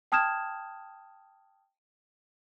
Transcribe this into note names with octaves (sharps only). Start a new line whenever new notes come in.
G5 A5 D#6 F6 G#6 E7